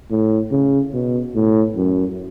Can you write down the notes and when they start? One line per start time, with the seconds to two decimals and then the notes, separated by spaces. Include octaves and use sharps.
0.11 A2
0.51 C#3
0.93 B2
1.35 A2
1.76 F#2